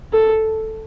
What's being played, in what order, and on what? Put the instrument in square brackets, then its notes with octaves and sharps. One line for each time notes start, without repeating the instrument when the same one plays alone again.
[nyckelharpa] A4